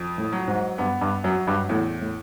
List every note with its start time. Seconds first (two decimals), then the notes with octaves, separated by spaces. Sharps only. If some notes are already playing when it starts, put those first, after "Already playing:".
Already playing: F2
0.18 A2
0.33 F#3
0.48 G#2
0.78 G2 B3
1.01 G2
1.24 F#2 F#3
1.47 G2
1.69 E2 A2
2.01 A2